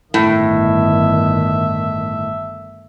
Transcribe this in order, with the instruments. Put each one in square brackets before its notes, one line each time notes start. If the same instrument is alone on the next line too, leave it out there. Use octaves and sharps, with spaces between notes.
[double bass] G1 D#3 [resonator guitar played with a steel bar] A2 [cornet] E5